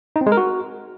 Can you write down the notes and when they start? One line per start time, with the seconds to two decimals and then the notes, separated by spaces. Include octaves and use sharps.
0.16 D#4
0.21 C4
0.26 G#3
0.32 A#4
0.37 F#4